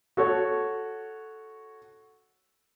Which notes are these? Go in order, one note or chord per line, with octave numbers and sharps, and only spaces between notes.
F#4 A4 C#5